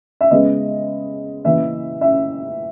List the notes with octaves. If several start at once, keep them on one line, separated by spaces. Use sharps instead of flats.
E5
C#3 G#3 B3 D#5
C#3 E3 A#3 E5
E5